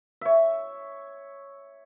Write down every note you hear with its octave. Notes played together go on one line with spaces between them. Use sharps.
C#5 E5